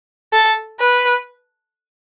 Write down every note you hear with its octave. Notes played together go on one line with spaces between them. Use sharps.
A4
B4